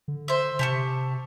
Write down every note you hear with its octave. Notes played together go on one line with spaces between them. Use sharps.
D3
C5 E5
C3 G4 A5 C#6